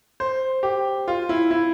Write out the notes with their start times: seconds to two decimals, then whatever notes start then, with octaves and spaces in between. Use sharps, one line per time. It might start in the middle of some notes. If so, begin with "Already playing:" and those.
0.20 C5
0.63 G4
1.08 F4
1.29 E4
1.51 E4